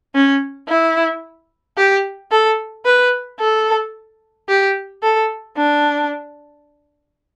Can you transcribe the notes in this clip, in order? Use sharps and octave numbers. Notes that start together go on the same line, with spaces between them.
C#4
E4
G4
A4
B4
A4
G4
A4
D4